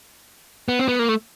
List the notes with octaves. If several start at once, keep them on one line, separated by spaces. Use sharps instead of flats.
B3
C4
B3
A#3
A3